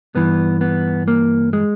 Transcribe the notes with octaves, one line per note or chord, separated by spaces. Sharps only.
G2 E3 B3
B3
A#3
G#3